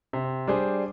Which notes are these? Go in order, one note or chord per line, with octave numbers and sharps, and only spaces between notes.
C3
G3 D4 G#4 C5